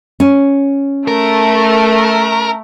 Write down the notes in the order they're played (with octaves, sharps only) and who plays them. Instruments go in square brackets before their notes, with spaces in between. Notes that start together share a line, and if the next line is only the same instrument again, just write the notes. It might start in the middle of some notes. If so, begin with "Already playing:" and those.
[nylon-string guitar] C#4
[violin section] A3 [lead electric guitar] A#4